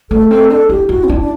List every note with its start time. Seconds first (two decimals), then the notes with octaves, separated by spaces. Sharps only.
0.11 A3 A4
0.31 C4 A4
0.50 D4 A4
0.69 E4 G4
0.89 E4 F#4
1.04 C4
1.09 D4 E4
1.20 D4